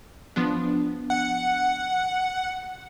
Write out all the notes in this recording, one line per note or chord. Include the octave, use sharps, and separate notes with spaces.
F3 B3 D4
F#5